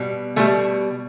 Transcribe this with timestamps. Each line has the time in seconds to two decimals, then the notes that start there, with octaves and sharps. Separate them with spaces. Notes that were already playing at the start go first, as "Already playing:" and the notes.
Already playing: B2 G3
0.36 B2 G3 A3